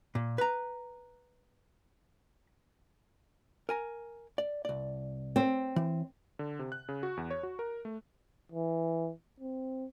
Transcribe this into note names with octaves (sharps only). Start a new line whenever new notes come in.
A#2
B4 A#5
A#4 G#5 A#5
D5
C2 D5
C4
E3
D3
C3
F#6
C#3
F#4
E2
C#5
F#4
A#4
A3
E3
C4